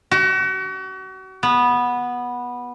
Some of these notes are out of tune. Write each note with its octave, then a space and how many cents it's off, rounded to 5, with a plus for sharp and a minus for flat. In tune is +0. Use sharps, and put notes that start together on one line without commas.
F#4 +35
B3 -10